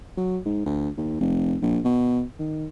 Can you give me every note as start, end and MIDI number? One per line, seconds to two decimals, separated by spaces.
0.17 0.38 54
0.46 0.62 44
0.66 0.89 38
0.97 1.19 39
1.20 1.56 29
1.62 1.79 34
1.84 2.22 47
2.39 2.66 51